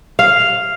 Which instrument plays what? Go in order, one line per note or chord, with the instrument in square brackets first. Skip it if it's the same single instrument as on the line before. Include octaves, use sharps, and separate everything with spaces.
[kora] F5